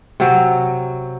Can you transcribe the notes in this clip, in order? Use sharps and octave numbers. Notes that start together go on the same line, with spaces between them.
C3 F#3